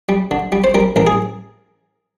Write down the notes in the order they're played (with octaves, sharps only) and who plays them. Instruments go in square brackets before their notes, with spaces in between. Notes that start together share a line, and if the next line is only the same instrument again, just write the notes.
[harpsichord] G3
D3
G3
C5
G3 A#4
A1 A#4
G#4